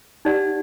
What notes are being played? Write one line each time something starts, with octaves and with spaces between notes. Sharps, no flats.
D#4 G4 D5 F#5